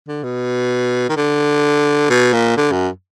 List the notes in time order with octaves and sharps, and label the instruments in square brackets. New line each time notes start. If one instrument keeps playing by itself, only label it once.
[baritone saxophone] D3
B2
D#3
D3
B2
A#2
D3
F#2